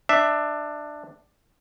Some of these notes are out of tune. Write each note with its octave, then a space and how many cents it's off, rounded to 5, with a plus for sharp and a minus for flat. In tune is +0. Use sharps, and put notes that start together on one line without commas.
D4 +15 E5 +0